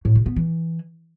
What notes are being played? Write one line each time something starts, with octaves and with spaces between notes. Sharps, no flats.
A2
C3
B3
E3